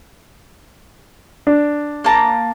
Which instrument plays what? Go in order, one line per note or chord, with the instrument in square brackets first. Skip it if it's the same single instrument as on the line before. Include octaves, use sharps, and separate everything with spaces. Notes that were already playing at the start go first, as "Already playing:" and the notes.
[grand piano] D4
[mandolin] A#3 A5 A#5